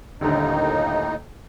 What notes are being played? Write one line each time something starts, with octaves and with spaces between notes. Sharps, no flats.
D#1 D#2 A2 D3 D#4